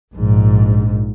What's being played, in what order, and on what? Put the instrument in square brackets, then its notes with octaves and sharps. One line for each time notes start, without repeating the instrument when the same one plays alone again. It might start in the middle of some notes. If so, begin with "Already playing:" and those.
[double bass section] A#1 G#2